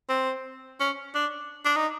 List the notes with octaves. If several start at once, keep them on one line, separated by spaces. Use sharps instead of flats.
C4
C#4
D4
D4
D#4